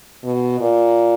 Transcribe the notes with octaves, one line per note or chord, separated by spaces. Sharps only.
B2
A#2